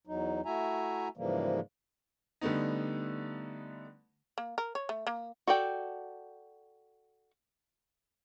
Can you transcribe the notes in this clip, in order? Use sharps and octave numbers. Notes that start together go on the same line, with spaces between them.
E2 F#3 D#4
A3 E4 F#4 E5 G#5 A#5
G#2 C#3 E3 F3 G3 A#3
D3 G3 A3 B3 D#4
A#3
A#4
C#5
A3
A#3
F#4 A4 D5 G5